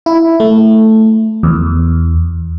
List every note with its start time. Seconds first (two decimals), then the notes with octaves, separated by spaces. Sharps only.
0.06 E4
0.40 A3
1.43 E2